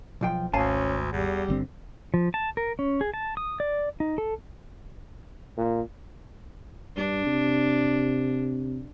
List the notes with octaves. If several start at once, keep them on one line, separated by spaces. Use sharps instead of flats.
B1 F3 G5
G#1 D2 C#4 F5 G#5 A5
E2 G3
G1 D3 C4
F3
A5
A#4
C#4
G#4
A5
D#6
D5
D#4
A4
A#2
G2 D4
C3